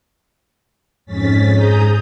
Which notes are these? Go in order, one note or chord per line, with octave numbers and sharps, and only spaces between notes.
F2 G#2 C#4 A6 B6
G#2 G#4 A#5 D#6 G6